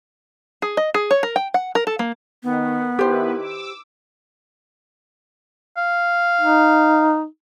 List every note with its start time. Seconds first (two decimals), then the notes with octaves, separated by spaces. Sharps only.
0.62 G#4
0.77 D#5
0.94 G#4
1.11 C#5
1.23 A#4
1.36 G5
1.54 F#5
1.75 A#4
1.87 A4
1.99 A#3
2.43 D#3 B3
2.99 D#3 E4 G4 B4 C5
3.37 D6 E6
5.77 F5
6.41 D#4